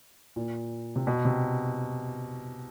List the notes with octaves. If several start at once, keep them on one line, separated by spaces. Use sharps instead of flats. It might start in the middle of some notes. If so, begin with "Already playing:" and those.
A#2
C3
B2
C3